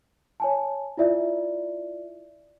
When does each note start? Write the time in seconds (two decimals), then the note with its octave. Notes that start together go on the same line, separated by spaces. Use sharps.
0.40 C#5 G#5 A5
0.97 E4 F4 D5 E5